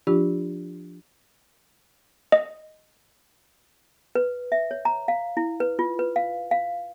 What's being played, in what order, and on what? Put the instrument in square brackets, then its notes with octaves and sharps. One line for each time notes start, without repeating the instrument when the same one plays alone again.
[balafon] F3 D4 F4 G4
[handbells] D#5
[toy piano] B4
E5
C#5
A#5
F5
E4
B4
F4
B4
F5
F5